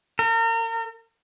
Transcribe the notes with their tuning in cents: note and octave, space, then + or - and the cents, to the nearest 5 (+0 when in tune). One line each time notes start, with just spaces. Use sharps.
A#4 -35